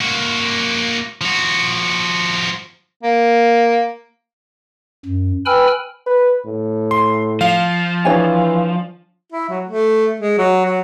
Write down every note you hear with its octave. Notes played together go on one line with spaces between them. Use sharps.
A#3 F#4
F3 F#4
A#3
F#2
B4 G5 G#5 B5 E6 F6
B4
A2
C6
F3 F5
E3 D4 C#5 G#5
E4
F#3
A3
G#3
F#3
F#3